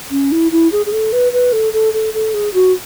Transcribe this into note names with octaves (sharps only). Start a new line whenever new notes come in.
C#4
E4
E4
G#4
G#4
A4
B4
B4
A4
A4
A4
A4
G#4
F#4